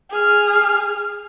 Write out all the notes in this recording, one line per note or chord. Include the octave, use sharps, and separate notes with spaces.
G#4 F6